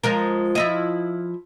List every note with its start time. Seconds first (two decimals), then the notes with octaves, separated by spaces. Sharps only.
0.04 F3 G#3 A#4
0.55 F3 E4 D#5